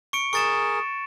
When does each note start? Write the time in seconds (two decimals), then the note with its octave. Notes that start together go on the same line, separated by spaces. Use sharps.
0.13 C#6 C#7 D7
0.33 G#4 A#4 C#6 A6 E7